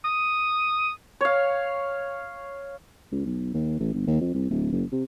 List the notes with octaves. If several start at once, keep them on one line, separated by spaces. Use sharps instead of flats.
D#6
C#5 F5
C#2
B1
D#2
A1
G1
D#2
F2
C2
D1
F#1
C3